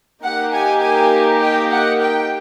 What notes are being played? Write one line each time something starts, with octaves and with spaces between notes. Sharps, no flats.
A#3 D#4 G4 F#5
G#5
G#5
G5
F#5
G5